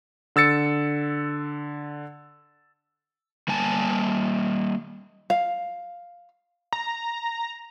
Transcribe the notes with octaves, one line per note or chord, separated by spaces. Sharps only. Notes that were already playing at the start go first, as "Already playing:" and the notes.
D3 E6 A6 C#7
G3 A#3 G#5 A5
F5
A#5